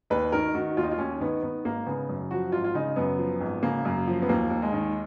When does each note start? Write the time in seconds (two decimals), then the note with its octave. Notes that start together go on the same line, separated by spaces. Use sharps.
0.10 D#2 B4
0.32 D#3 A#4
0.55 D#3 F#4
0.77 D#2 F4
0.83 D#4
0.92 F4
0.98 D#2 C#4
1.20 D#3 B3
1.43 D#3 B3
1.65 G#1 A#3
1.86 C#3 B3
2.09 F#2
2.31 F3 F#4
2.52 G#1 F4
2.64 F4
2.74 C#3 D#4
2.96 F#2 B3
3.18 F3
3.41 G#1
3.63 C#3 A#3
3.85 F#2
4.07 F3
4.22 B3
4.29 D#2 A#3
4.50 D#2
4.62 G#3
4.73 D#3